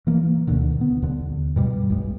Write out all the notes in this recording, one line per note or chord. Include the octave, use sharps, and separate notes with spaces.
E3 A#3
D2 B2 D3 D#3
B3
D#2 D3
G2 B2 G3
B1 G2 G#3